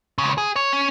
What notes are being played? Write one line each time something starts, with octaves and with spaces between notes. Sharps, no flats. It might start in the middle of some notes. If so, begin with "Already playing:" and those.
C#2 C#3
G#4
C#5
C#4